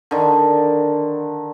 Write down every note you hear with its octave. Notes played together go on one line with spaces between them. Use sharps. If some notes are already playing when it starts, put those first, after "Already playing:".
D3 D#3